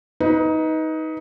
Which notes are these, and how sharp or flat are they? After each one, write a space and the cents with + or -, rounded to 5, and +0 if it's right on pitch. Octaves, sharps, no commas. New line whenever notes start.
D#4 +20 B4 +0